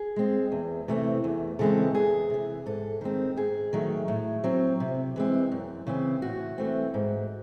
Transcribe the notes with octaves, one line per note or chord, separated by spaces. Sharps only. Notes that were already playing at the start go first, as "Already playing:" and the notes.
Already playing: G#4
G#3 C4
E2
C3 E3 A3 C4
E2
C#3 E3 G#3 C4 A4
E2 G#4
C3 E3
G#2 A4
D#3 G#3 C4
G#2 G#4
D#3 F#3 A3
A2
F#3 C4
C3
E3 G#3 C4
F#2
C#3 E3 C4
A2 F#4
E3 A3 C4
G#2